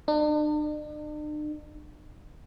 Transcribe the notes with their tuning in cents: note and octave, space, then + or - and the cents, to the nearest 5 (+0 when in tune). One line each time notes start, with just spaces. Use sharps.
D4 +45